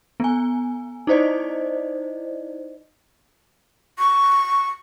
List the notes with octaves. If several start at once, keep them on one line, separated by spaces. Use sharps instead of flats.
B3 G#5
D#4 E4 C5 D5 D#5
C#6